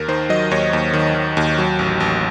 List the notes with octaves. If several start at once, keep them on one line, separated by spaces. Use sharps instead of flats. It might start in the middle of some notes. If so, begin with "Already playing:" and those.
Already playing: D#2 A#4
D#3 C5
F#3 D#5
D#2 C#5
D#2
D#3
D#3
D#2
F#3
A1
A1